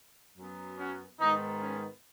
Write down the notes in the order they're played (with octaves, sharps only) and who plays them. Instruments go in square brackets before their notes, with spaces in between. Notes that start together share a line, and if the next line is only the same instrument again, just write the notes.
[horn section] F#2 F#3 B3
C#4 F#4
G#2 D#3 B3 D#4
C#4